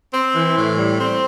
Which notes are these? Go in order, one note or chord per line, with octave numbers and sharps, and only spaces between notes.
C4
E3
A2
G3
C4